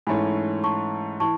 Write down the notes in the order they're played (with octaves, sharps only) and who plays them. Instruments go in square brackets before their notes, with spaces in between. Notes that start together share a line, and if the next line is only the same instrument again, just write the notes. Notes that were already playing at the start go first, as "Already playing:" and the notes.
[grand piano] G#2 E3 A3 C#4 [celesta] G#5 B5
[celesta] A5 C#6
[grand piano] E3 [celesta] A5 C#6